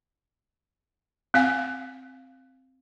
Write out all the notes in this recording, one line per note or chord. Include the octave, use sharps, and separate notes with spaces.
C4 F5 G#5